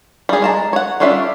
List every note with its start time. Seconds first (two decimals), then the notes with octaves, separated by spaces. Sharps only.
0.29 G3 G#4
0.42 G#3 A5 A#5
0.73 C#5 F#5
1.00 G3 C#4 D4 F4 E5